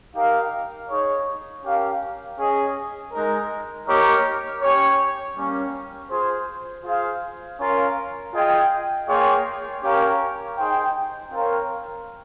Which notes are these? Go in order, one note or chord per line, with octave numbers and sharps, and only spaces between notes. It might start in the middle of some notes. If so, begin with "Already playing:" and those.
D#4 G4 A#4 F5
D#4 G#4 C#5
C#4 G4 A#4 F5
C#4 G#4 D#5
G#3 D#4 A#4
A#3 D#4 G4 A#4 C#5
C#4 G4 C#5
G3 A#3 C#4
F4 G#4 C5
F4 G#4 C5 F5
C#4 F4 A#4 F5
F4 G#4 D#5 G5
A#3 F4 G#4 C#5 G5
C#4 G4 A#4 C#5 F5
D#4 G#4 C5 G5
C4 F4 A#4 C#5 F5